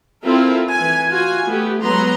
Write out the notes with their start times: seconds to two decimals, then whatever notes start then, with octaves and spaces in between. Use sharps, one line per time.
0.24 C4 E4 F4 A4 A#4
0.72 E3 G#5
1.09 F4 F#4 G#5
1.46 A3 B3 G4
1.82 F#3 G#3 B3 B4 A#5 C6